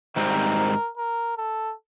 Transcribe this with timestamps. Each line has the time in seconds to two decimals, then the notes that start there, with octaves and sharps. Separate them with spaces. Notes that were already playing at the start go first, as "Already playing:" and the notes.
0.16 G#2 D#3 G3 C4 A#4
0.97 A#4
1.38 A4